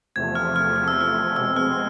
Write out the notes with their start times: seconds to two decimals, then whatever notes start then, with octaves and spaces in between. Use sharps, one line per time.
0.15 E2 C3 F3 A3 G#6
0.35 F6
0.56 F6
0.76 F6
0.88 E6
1.01 F6
1.36 B2 G#3 C4 E6
1.56 F6